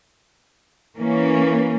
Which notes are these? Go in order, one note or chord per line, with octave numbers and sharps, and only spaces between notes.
E3 A#3 C#4